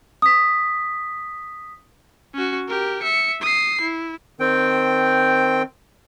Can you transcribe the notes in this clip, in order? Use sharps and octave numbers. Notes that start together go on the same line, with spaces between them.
D#6 B6
C#4 F#4
G4 A#4
E5 C#7
D#6 C7
E4
D#3 C4 G5